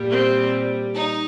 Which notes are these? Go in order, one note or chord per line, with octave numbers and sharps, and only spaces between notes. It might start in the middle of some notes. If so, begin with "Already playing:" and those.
Already playing: A#2 G3
C4
D#4